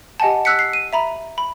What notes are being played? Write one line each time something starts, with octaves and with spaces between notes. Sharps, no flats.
G4 D#5 F#5 G#5 A5
E6 F#6 B6 C#7
C7
D#7
E5 A#5 B5
B5